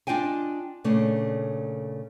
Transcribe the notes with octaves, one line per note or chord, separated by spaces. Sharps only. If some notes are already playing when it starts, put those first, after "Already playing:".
D4 F4 D#5 G5 G#5
A#2 C#3 A3 D4